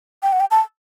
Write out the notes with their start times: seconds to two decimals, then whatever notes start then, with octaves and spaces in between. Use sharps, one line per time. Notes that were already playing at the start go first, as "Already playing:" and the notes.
0.23 G5
0.33 F#5
0.40 G5
0.51 A5